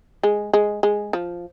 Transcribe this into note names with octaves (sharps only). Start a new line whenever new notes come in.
G#3
G#3
G#3
F3